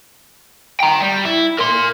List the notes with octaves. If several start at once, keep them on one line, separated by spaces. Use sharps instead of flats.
G5 A#5
G3
E4
A#4 C6